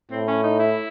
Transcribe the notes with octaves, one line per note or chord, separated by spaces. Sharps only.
A2 C4
C#4
D#4
E4